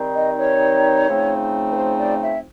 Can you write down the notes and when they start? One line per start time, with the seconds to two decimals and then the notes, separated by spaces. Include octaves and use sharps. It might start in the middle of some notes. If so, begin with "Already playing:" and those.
Already playing: D#3 G3 C4 D#4
0.15 D#5
0.39 C#5
1.07 C#3 F3 A3 C4 D#4
1.72 B4
1.77 C5
1.99 D5
2.23 E5